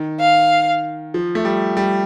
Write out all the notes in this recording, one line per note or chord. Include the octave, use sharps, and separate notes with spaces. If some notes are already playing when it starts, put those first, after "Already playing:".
Already playing: D#3
F5
F3
A3
G3
G3